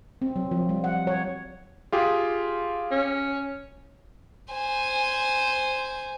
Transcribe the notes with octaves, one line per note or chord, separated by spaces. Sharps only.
C4
F#3
F3
G3
F#5
C#5
F4 G4 G#4
C#4
C5 G#5